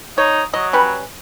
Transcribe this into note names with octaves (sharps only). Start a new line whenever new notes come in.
D#4 C#5
F#3 D#5
G3 C#4 B4